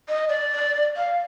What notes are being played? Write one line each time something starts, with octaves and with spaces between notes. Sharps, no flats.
D#5
D5
F5